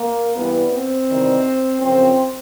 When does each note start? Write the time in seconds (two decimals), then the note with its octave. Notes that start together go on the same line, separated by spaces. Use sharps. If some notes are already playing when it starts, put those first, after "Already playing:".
Already playing: A#3
0.36 G2 E3 G3 B3
0.73 C4
1.09 E2 C3 D#3 G3
1.82 F#2 C#3 F3 C4